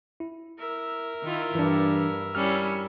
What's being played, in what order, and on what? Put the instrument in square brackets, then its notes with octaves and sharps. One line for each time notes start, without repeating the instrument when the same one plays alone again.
[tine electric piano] E4
[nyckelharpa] A#4 E5
[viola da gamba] D#3 E4 F4
[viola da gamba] G2 [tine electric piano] E3 D4
[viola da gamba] G3 C#4 E4 [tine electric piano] F6